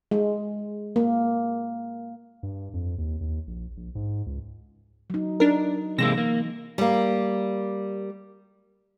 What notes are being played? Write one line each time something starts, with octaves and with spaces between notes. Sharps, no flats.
G#3
A#3
G2
F2
D#2
D#2
A#1
A#1
G#2
C#2
F#3 D#4
D4 D#4 A#4
C3 E3 G#3 A#3 E6 A#6
A#3
G3 A#3